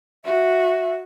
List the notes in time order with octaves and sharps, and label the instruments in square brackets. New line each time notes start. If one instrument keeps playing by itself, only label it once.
[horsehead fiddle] F#4 [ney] E5